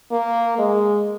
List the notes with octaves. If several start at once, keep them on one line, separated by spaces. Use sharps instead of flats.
A#3
G#3